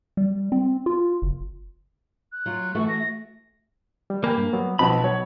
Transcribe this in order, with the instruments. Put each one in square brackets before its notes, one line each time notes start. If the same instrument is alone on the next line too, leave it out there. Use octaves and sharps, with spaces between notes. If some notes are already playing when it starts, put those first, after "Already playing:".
[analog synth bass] G3
C4
F4
F#1
[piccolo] F#6
[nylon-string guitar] F#3 F4
[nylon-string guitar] E3 A3 F#4 [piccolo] C#6
[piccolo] A#6
[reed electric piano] G3
[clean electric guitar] A#3 [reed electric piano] G5 G#5 B5
[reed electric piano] G2
F#3 G3 B3
[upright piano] B1 B2 A5 [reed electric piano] F3 C4 [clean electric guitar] B5
[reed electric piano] F#3 [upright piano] C#5